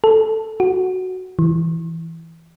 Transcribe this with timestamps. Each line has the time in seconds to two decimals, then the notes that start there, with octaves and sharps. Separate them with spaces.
0.04 A4
0.60 F#4
1.39 E3